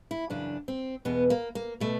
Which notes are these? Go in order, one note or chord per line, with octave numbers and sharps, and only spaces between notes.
E4
F#2 C#3 E3 D4
C4
E2 B2 B3
A#3
A#3
B2 A3